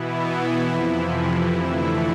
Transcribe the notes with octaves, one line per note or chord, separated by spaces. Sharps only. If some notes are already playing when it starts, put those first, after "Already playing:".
Already playing: B2 E3 B3 E4
F2 C3 F3
F2 D3 E3 A3 E4